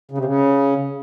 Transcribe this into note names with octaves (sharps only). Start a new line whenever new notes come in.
C#3
C3
C#3